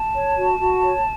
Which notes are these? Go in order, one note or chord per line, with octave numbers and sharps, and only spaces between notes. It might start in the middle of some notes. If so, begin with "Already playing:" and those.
Already playing: A5
C#5
F#4
F#4
C#5